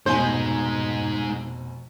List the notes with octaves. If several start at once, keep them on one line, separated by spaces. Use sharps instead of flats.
F1 B2 G#3 D#4 C5 G#5